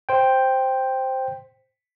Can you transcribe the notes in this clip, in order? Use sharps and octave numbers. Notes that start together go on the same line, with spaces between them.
C5 G5